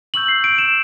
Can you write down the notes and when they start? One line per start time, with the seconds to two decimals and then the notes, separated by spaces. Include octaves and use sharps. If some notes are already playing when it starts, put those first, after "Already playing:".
0.14 C#6 E6 G6 F#7
0.28 C7
0.44 D7
0.58 E7